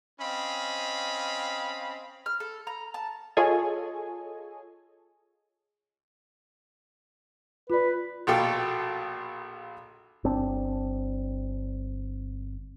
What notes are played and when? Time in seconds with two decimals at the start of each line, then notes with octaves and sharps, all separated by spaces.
0.21 C4 C#4 D#5 F5 B5
2.26 F6
2.40 A4
2.67 A#5
2.94 A5
3.37 F4 G#4 A4 C#5 D#5 G#5
7.70 F4 B4 D5
8.27 A#1 B2 F4 A4 G5 D6
10.24 G1 C4 D4